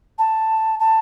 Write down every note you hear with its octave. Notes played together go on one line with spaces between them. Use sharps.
A5
A5